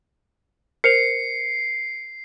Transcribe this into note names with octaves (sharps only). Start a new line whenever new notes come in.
A#4 C5 C7 C#7 F7